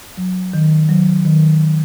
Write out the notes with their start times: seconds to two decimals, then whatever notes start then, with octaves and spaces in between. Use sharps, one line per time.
0.17 F#3
0.54 D#3
0.89 F#3
1.25 D#3